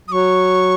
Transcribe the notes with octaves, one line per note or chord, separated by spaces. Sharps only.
F#3 C#6 D#6